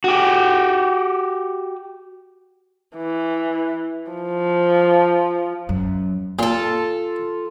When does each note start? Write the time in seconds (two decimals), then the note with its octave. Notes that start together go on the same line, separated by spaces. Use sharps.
0.04 F#4 G4
2.97 E3
4.11 F3
5.69 F#2
6.39 A#2 F4 A4